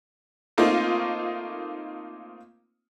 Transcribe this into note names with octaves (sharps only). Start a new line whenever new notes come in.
A3 A#3 C4 D#4 F4